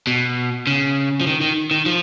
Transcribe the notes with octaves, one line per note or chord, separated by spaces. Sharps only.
B2
C#3
F3
D#3
D#3
D#3
F3